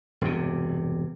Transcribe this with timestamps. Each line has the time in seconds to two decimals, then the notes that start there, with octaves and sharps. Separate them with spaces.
0.21 E1 G2 C3